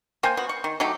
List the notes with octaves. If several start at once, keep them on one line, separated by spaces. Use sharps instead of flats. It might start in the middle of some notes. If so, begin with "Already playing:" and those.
A#3 C5 G5 G#5
B3 F#4
C#6
D#3
F#3 A3 D#4 G4